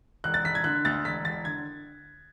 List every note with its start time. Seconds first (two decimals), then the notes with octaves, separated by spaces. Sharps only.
0.24 E1 F#6
0.34 A6
0.44 E1 B6
0.55 G#6
0.64 D3 F#6
0.85 D2 A6
1.05 E1 B6
1.25 E1 A6
1.45 D3 G#6